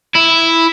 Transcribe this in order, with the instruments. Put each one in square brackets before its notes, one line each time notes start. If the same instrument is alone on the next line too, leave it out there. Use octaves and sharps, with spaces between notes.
[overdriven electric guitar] E4